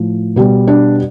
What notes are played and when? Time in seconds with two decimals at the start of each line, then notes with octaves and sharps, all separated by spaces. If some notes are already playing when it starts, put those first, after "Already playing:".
Already playing: A2 F3
0.36 B2 G3
0.68 D4